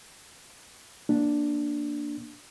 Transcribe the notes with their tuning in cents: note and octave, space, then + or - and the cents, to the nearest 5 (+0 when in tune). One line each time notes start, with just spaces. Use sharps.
A#3 +0 D4 +0